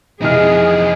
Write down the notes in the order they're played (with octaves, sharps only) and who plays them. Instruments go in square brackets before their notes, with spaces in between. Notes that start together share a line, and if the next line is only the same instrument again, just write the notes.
[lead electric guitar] F2 D#4 [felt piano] C3 E3 F6 [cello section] G#4